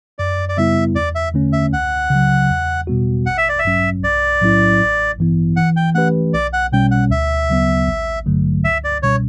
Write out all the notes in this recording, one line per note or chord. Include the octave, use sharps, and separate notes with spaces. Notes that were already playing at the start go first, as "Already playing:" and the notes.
F#2 D5
D5
C#3 G3 B3 E4 E5
E2 D5
E5
D3 A3 C#4
E5
C#2 F#5
C#3 F#3
E2
B2 G3 B3 F#4
A1 F#5
E5
D5
E5
G2 F#3 C#4
B1 D5
A2 F#3 C#4 E4
A1
G2 E3 B3 E4
E3 F#5
G5
A3 C#4 G4 B4 F#5
B1 D5
F#5
B2 G3 C#4 G5
F#5
D2 E5
C#3 F#3 B3
A1
G2 D3 F#3 A3
C#2 E5
D5
B2 G3 C#4 C#5